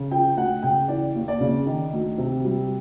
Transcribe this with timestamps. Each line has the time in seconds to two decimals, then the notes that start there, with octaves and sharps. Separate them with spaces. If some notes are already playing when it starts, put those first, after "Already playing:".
Already playing: C#3
0.11 F3 G5
0.36 D2 F#5
0.63 C#3 G5
0.88 E3 D5
1.15 D#2
1.28 D5
1.41 C#3
1.66 D#3
1.93 D2
2.18 C3
2.45 G3